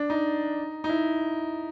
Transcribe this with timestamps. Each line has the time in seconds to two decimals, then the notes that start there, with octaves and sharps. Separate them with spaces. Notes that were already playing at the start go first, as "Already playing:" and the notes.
Already playing: D4
0.10 D#4
0.84 D#4
0.89 E4